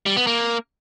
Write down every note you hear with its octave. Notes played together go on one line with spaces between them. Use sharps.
G3
B3
A#3